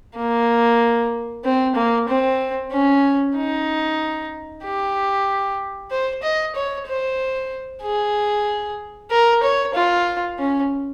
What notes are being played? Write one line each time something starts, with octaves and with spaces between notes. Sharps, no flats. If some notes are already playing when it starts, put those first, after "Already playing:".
A#3
C4
A#3
C4
C#4
D#4
G4
C5
D#5
C#5
C5
G#4
A#4
C#5
F4
C#4